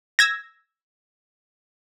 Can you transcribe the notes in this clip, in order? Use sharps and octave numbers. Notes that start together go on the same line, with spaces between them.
E6 G#6 A#6